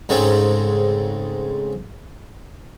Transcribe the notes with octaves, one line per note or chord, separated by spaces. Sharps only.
G#2 C#3 G#3 A3 C4